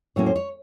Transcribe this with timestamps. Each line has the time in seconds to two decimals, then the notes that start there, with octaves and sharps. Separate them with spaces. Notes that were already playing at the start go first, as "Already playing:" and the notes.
0.16 A2 F#3 A#3 C#4 C#5
0.26 C5
0.36 C#5